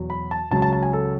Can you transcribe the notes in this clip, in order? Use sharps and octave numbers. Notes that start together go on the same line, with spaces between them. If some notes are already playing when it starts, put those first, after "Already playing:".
Already playing: E2 B2 F#3
B5
A5
C#2 C#3 F#3 A5
A5
A5
G#5
A4